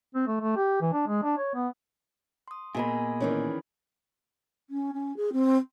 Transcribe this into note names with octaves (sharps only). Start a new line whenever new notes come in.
C4
A3
A3
G4
E3
D4
G#3
D4
C#5
B3
C6 D#6
A#2 B3 G#4 A#4 D#5 B5
D#3 E3 C#4 D5
C#4
C#4
G#4
C4